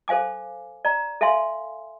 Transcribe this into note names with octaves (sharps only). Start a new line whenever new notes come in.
A4 C5 F5 G#5 D6
D5 A#5
A4 E5 F5 G#5 C6